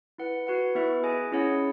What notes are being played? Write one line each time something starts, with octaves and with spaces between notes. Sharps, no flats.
E4 B4 F#5
F#4 B4 F#5
B3 E4 B4 E5
G#4 D#5 G#5
C#4 E4 G#4 C#5 F#5